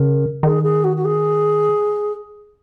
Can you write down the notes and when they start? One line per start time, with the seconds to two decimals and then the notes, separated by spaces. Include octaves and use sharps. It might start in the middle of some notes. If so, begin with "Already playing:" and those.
Already playing: C#3 A#4
0.43 D#3 G#4
0.63 G#4
0.84 F#4
0.96 F#4
1.04 G#4